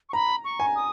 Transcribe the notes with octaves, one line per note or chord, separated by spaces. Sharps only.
C#6
A#5 B5
C#6
G#5
D#6